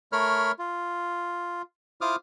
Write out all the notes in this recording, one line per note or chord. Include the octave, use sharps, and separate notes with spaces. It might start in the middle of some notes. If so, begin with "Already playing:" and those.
A3 A#4 C#5 B5 F6
F4
E4 F4 C5 D6 D#6 F6